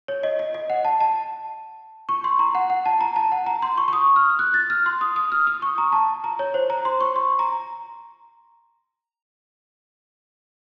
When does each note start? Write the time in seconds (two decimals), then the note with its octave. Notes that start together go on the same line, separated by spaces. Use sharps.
0.08 C#5
0.23 D#5
0.39 D#5
0.54 D#5
0.70 F#5
0.85 A5
1.01 A5
2.09 C#6
2.24 C6
2.39 A#5
2.55 F#5
2.70 F#5
2.85 A5
3.01 A#5
3.16 A5
3.32 F#5
3.46 A#5
3.62 C6
3.77 C#6
3.88 C#6
3.93 D#6
4.16 F6
4.39 F#6
4.54 A6
4.70 F6
4.86 C6
5.01 D#6
5.16 D#6
5.32 F6
5.47 D#6
5.62 C#6
5.78 A#5
5.92 A5
6.24 A#5
6.39 C#5
6.54 C5
6.70 A#5
6.85 C6
7.01 C#6
7.16 C6
7.39 A#5